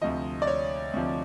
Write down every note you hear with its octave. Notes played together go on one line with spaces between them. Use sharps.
D2 C3 F3 D#5
D5
C#5
D2 C3 F3